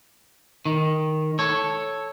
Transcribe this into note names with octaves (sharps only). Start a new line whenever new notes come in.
D#3
A4 C#5